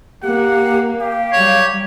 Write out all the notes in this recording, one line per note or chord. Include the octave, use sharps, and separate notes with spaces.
A#3 G4 F#5
G4 F5
F#3 G3 C#5